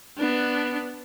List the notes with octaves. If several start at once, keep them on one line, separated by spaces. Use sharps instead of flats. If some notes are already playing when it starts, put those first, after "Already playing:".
B3 D4